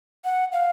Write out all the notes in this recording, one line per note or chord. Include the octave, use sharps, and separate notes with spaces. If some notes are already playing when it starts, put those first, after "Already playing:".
F#5
F5